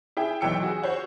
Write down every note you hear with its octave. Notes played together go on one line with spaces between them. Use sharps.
E4 G#4 G5
B1 E3 F#3 G5 E6 C#7
F#4 G#4
F#4 C5 C#5 F#5